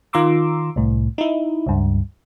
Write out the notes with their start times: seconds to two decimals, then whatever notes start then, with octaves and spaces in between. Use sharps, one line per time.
0.13 D#3 F4 A#5 C6 D6 E6
0.76 C2 A2
1.18 D#4 E4
1.66 C#2 G2